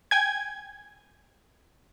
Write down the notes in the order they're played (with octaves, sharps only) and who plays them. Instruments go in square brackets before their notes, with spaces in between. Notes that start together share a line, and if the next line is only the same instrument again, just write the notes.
[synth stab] G5 G#5 G#6